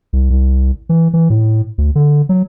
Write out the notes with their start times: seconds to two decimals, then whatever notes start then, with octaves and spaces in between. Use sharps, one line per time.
0.13 C2
0.30 C2
0.89 E3
1.13 E3
1.30 A2
1.78 D2
1.95 D3
2.29 F#3